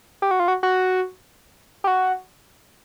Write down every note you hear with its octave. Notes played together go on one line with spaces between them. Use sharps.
G4
F#4
F4
F#4
F#4
G4
F#4